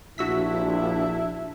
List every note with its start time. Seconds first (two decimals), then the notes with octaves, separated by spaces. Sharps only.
0.18 A#1 D4 E4 F#4 E6 B6